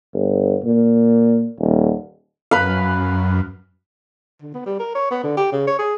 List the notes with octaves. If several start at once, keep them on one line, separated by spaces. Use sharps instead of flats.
G1
A#2
D#1
F#2 B4 F5
D3
B3
G3
A#4
C#5
B3
D3
G4
C#3
C#5
G#4